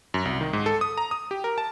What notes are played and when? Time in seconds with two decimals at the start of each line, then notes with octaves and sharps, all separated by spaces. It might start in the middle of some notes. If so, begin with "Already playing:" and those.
0.14 F#2
0.25 C2
0.41 D#3
0.53 G#2
0.66 A4
0.81 D#6
0.98 A#5
1.11 D#6
1.31 G4
1.44 A#4
1.58 A5